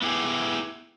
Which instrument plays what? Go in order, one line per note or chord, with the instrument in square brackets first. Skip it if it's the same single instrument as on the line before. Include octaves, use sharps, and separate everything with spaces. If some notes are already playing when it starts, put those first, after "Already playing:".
[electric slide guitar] B3 E4 G4 G#4